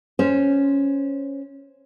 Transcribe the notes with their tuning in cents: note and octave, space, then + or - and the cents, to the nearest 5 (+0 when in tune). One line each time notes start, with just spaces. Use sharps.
C#4 +0 C5 +0